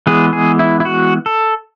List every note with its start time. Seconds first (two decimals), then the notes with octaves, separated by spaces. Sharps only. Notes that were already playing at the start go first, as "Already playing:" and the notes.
0.07 E3 G#3 B3 G#4
0.33 G#4
0.59 E4
0.80 E4
0.85 F#4
1.26 A4